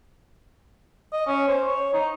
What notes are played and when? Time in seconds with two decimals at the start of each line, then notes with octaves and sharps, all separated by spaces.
1.13 D#5
1.27 C#4
1.48 C5
1.67 C#5
1.94 D#4